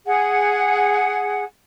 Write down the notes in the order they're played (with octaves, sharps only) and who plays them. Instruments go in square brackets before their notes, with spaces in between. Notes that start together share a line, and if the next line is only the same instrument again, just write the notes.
[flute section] G#4 F#5